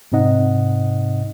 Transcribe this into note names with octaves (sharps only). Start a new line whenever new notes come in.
G#2 C3 C4 D#4 D#5 F#5